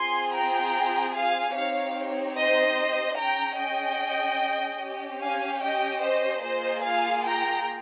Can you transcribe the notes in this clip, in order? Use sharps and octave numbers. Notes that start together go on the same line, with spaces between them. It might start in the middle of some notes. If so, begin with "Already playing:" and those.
Already playing: C4 F4 G#4 G#5 C6
G5 A#5
F5 G#5
C4 D#4 G4 C#5 F5
C#5
C5 D#5
C#4 G#4 G5 A#5
D#5 G5
C#4 G4
F5 G#5
D#5 G5
C5 D#5
A#3 F4 G#4 C5 D#5
F5 G#5
G5 A#5